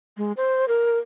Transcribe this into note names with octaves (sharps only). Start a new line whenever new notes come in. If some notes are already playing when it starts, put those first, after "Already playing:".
G#3
C5
A#4